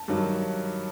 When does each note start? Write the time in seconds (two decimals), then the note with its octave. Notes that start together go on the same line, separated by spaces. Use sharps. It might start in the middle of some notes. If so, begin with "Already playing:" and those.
Already playing: A5
0.08 G2 D#3 F#3